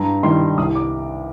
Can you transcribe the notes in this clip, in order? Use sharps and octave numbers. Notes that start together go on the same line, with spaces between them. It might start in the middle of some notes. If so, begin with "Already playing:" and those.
Already playing: G2 A#5
D#3 G3 C6
C2 D#6
D6